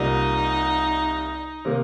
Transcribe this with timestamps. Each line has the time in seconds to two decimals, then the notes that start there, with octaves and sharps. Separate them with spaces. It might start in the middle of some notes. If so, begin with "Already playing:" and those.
Already playing: C2 C3 G3 A#3 D#4 F4
1.65 C3 D#3 A#3